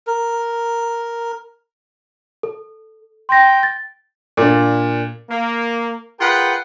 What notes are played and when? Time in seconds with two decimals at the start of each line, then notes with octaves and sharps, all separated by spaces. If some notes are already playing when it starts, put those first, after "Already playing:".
0.07 A#4
2.43 A4
3.29 G5 C6 A#6
3.63 A6
4.37 A#2 D4
5.30 A#3
6.20 F4 G#4 A#4 B4 F#5 G5